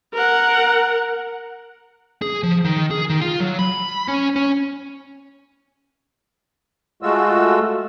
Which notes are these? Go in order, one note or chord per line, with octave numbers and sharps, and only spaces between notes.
A#4 F#5
G#4
F3
D#3
G#4
D#3
F4
F#3
B5
C#4
C#4
G#3 A3 F4 F#4 E6